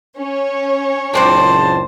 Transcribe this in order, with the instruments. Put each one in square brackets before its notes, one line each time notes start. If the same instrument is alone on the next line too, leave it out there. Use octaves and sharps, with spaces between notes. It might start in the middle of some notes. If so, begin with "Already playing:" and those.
[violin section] C#4 C#5
[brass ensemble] F#1 C#2 A5 [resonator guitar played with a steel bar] A#2 C4 D4 [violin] C5